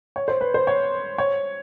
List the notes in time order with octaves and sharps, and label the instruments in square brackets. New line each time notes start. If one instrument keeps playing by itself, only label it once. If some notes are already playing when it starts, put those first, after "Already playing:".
[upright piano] C#5
C5
B4
C5
C#5
C#5